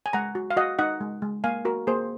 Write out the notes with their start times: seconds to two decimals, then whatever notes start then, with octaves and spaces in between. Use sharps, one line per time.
0.06 G#5
0.13 G#3 F#5 A#5
0.35 F#4
0.51 F5
0.56 F#4 D#5 F#5
0.79 D#4 D#5 F#5
1.01 G#3
1.22 G#3
1.44 A#3 F5 G#5
1.65 F#4 A#4
1.87 A#3 G#4 C5